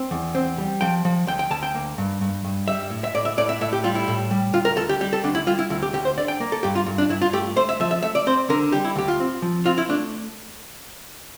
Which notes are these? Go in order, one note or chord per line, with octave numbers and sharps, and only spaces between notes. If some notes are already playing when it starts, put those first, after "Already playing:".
Already playing: C4
E2
C4
G3
F3 G5
F3
D2 G5
G5
D2 A5
G5
A#3
G2
G2
G2
G3 E5
A2
E5
A2 D5
E5
A2 D5
E5
A2 E5
G4
G3 F4
E4
A2
G3
D2 F4
A#4
D2 A4
G4
G3 G4
A4
D2 D4
E4
G3 F4
E4
D2 E4
G4
D2 G4
C5
D3 D5
G5
A#3
A4
G2 G4
F4
G2
D4
G2 E4
F4
A3 G4
A3 C5
E5
F3 E5
E5
A3 E5
D5
C4 C5
D3 A#4
G3 G4
E4
D2 G4
F4
C4
F3
C4 F4
E4
A3 D4